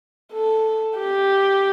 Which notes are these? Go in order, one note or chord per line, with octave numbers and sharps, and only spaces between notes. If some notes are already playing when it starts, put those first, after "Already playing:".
A4
G4